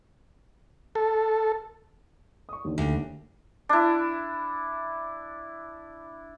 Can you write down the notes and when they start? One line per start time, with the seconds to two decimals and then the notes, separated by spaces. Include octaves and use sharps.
0.95 A4
2.49 C#6 D#6
2.64 D#2 D3 D#3
2.78 D2
3.69 D4 E4